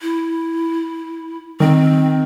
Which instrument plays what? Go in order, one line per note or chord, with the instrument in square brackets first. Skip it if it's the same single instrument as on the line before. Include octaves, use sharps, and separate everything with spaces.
[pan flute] E4
[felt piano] D#3 [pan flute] C4